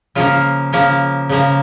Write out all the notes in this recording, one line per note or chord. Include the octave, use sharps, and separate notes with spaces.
C#3 F3 A#3 F4
C#3 F3 A#3
C#3 F3 A#3